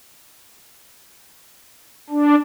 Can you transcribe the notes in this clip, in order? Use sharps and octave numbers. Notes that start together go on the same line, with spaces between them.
D4